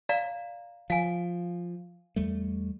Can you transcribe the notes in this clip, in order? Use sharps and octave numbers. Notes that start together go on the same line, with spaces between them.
D5 F5 A#5
F3 F5 G#5
E2 G3 A3